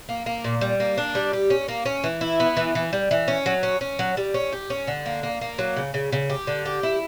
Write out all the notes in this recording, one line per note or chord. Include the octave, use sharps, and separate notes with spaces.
A#3
A#3
A#2
G3
A#3
D4
G3
G4
C#4
A#3
C#4
E3
E4
B3
E3
E3
G3
E3
C#4
F#3
C#4
C#4
F#3
G3
C#4
G4
C#4
D3
A#3
A#3
A#3
F#3
C#3
C#3
C#3
G4
D3
G4
E4